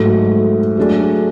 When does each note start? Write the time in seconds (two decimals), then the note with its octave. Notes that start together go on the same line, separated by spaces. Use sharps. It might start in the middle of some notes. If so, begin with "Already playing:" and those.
Already playing: G#2 F#3 A3
0.77 F#3 A3 D4 G#4